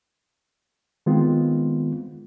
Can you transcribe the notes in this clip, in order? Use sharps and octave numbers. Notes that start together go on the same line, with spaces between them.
D#3 G#3 B3 C4 F4